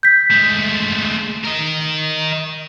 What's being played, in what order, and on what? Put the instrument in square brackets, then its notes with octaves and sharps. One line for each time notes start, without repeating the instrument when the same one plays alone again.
[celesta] G6 B6
[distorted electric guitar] G#3 A3
A#4 D#5